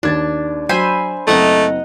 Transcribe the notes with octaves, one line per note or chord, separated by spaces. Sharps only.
D#2 D4 G#6 A6
F#3 C5 E5 G#5 B5
F#1 A3 C4 D#5 F#5 A#5